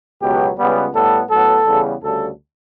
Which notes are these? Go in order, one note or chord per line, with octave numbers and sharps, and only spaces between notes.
C#2 B2 F#3 B3 G4
C#2 C#3 G3 B3
A2 G3 B3 A4
A2 F#3 B3 A4
E2 C#3 G3 B3
D2 C#3 G3 A4